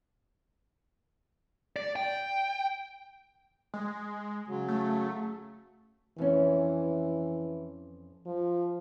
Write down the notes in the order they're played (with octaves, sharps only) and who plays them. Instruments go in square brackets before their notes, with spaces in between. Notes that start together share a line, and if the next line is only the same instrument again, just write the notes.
[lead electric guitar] D5
G5
[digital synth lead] G#3
[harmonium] C#3 F#3
[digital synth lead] A3
[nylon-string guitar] F2 C#4 [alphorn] E3
[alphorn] F3